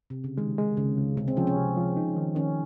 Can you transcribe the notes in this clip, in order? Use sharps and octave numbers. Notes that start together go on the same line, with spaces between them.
C3
C#3
D#3 G#3
G#3
C#2 C#3
C#2
C3 G#3
C4
F3 C#4
C#4
C3
F3
D#4
D#3
D#3 C#4